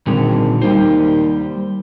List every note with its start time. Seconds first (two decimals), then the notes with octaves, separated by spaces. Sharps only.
0.07 G#1 A#2 D3 G3
0.62 D#2 G3 C5